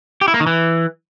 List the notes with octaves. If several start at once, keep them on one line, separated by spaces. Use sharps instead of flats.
G4
E4
A#3
D#3
E3